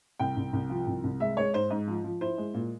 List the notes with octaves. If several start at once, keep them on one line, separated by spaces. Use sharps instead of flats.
C2 G5
C2
C2
F3
C2
C2
G#3 E5
G#3 C#5
G#2 C5
G#2
F3
F3
E4 C5
G#3
A#2